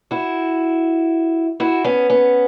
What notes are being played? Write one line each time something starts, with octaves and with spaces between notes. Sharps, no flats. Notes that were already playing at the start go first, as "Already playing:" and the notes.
E4 F#4
E4 F#4
B3 C#4
B3 C#4